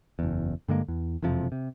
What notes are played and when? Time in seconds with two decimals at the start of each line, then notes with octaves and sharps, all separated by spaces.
0.19 F#1 E2
0.68 G2 D3 G#3 A#3
0.88 E2
1.22 E1 F2 C3 F3
1.52 C3